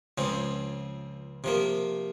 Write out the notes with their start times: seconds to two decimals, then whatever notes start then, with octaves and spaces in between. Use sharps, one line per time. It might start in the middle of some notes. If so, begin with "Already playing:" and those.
0.18 C#2 C#3 F3 C4
1.44 C3 F3 A#3